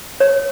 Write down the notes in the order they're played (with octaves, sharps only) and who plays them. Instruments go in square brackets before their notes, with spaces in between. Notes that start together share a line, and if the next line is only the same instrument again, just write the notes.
[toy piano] C#5